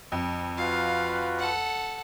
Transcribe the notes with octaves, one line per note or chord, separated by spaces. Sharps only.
F2
F4 F#4 B4 F5
A4 F#5